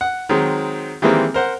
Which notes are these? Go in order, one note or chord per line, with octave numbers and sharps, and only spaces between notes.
F#5
D#3 F#3 G#3 C4
D#3 E3 G3 G#3 A#3 C4
A#4 C5 F#5